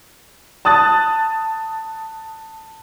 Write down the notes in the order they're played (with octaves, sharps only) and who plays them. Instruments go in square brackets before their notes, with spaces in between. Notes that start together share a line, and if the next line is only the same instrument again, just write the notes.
[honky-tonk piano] A5 D#6 F#6 A6